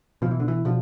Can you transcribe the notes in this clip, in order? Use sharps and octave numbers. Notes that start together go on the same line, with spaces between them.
B2 F3
E3
D3
E3
B2 D3 F3